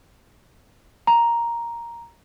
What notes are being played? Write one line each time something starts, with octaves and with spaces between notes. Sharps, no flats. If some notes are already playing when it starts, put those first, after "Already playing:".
A#5